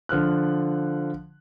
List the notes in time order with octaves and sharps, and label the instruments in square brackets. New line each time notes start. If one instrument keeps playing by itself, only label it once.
[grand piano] D3 F3 F6 F#6